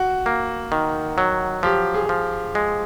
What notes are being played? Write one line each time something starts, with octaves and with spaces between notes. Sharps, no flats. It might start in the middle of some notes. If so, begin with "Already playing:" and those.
Already playing: F#4
A#3
D#3
F#3
F3 G4
G#4
F3
G#3